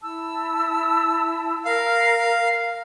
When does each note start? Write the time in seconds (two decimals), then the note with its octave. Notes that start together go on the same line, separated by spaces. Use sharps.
0.02 E4 A5 E6
1.65 A#4 F5 A#5